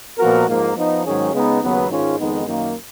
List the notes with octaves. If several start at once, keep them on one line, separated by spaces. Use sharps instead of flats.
A#2 F3 B3 F#4 A#4
G#2 F3 A#3
F3 B3 D#4
G#2 D#3 F#3 C#4 G#4
C#3 G#3 B3 D#4
D#2 C#3 F#3 B3
G#2 D#3 G#3 C#4 F4
F2 D#3 G#3 B3 D#4
F#2 D#3 A#3